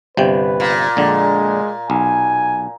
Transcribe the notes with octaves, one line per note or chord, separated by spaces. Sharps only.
G1 C3 B4 G5
A#2
A#1 D3 G#3
B1 G#5